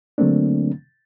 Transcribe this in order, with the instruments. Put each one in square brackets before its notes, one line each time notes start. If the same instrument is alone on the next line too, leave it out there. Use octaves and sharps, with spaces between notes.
[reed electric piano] D3 F#3 A3 A#3 C4 D4